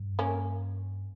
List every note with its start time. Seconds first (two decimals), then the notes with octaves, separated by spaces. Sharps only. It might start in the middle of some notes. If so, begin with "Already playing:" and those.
Already playing: G2
0.19 A#3 C#4